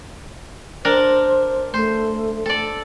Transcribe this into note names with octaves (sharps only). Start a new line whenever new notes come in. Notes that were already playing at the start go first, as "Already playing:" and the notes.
D4 A#4 C5
A3 C5
A4 D5